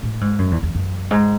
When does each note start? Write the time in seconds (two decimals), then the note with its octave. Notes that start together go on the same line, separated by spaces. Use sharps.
0.03 A2
0.21 G#2
0.39 F#2
0.51 E2
0.63 E2
0.75 F#2
1.11 G#2